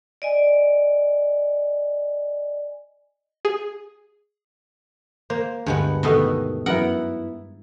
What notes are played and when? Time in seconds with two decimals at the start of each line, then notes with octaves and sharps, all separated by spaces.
0.22 D5 D#5 G#5
3.45 G#4
5.30 A#3 C5
5.66 D2 G2 G#3 B3
6.03 B2 D#3 A3 B3 B4 D#5
6.66 F#2 B3 E4 A#4 F#5